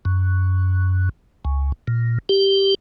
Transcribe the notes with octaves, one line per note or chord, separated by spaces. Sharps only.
F#2
C#2
A#2
G4